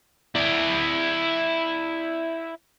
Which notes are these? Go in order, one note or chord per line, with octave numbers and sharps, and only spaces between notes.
E4 D5